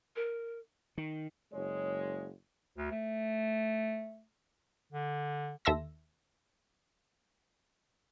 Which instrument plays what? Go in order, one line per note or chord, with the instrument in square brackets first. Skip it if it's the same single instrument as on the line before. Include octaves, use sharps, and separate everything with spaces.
[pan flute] A#4
[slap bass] D#3
[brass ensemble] F#1 G#3 C#5
[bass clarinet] D2
A3
D3
[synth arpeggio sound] D#2 A4 E5 C6 E6 A#6